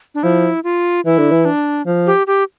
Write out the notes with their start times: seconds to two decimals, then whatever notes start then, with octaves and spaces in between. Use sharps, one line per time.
0.15 D4
0.23 F3 E4
0.64 F4
1.05 E3 E4
1.18 D3
1.31 E3
1.45 D4
1.86 F3
2.07 G4
2.27 G4